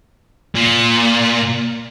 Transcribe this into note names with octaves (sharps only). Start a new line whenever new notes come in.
A#2